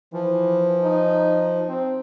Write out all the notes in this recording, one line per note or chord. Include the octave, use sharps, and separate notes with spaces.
E3 F3
D#4
C4